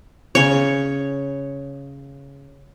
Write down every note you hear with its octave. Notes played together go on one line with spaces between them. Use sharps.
C#3 C#5